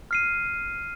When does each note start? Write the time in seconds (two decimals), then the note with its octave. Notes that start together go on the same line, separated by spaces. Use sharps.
0.11 F6 C7 D#7